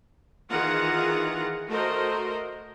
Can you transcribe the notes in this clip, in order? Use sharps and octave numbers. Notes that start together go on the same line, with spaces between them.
D#3 E3 F4 G#4 F#5 A#5
A3 F#4 A#4 C5 D#5